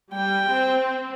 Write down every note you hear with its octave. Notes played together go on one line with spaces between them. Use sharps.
G3 G5
C4